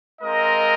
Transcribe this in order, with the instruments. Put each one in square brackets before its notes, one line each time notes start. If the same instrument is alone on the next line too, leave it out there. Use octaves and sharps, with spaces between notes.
[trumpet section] G#3 C4 F4 A#4 D#5